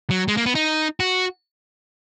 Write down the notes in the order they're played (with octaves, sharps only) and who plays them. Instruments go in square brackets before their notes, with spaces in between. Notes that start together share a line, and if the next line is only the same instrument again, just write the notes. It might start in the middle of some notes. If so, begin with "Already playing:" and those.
[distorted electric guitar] F#3
G#3
A#3
B3
D#4
F#4